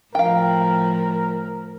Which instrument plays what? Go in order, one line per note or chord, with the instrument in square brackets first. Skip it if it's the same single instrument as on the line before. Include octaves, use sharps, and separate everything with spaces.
[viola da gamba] A2 F3 [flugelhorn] A#4 [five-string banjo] F5 G5